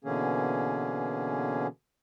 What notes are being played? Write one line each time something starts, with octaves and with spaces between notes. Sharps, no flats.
B2 D3 E3 A#3 C#4 G#4